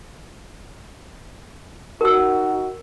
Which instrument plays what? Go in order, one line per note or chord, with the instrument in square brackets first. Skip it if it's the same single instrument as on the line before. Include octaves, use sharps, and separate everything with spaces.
[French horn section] D#4 F#4 [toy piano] A#4 E6